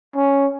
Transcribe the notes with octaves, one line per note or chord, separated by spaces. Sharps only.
C#4